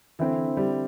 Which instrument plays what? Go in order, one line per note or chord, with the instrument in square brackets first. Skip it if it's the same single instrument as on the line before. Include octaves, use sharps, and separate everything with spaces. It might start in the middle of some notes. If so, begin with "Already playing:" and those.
[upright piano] D3 C4 E4 [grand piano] E3
[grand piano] G3